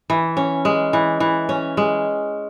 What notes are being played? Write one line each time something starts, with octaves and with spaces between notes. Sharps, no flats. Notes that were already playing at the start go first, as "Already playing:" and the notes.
E3
C#4
G#3
E3
E3
C#4
G#3